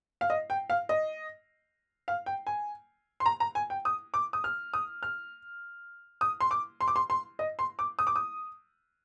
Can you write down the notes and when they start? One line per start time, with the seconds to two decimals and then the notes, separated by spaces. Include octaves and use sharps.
0.21 F5
0.30 D#5
0.50 G5
0.70 F5
0.89 D#5
2.08 F5
2.26 G5
2.47 G#5
3.20 C6
3.26 A#5
3.40 A#5
3.55 G#5
3.70 G5
3.85 D#6
4.14 D6
4.33 D#6
4.44 F6
4.74 D#6
5.03 F6
6.21 D#6
6.41 C6
6.51 D6
6.81 C6
6.88 D6
6.96 C6
7.10 C6
7.39 D#5
7.59 C6
7.79 D6
7.99 D#6
8.07 D6
8.16 D#6